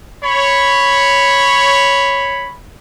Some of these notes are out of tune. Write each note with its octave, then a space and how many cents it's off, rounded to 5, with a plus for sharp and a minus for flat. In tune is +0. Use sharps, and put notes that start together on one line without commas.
C#5 +0 B5 +0